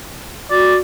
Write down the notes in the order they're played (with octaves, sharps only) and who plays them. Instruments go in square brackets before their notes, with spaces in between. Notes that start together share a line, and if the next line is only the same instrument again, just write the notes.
[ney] F#4 [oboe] D5